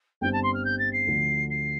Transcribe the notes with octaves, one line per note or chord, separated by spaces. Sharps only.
G1 G2 G3 C4 G5
A5
C6
F6
G6
A6
C7
D2 D3 F3
C7